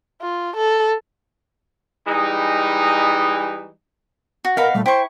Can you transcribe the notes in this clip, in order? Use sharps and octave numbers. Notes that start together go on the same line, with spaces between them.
F4
A4
E3 G3 G#3 D#4
F#4
A#4 B4 D#5 F5 F#5 B5
A#2 G3 A3
E4 C5 G5 C#6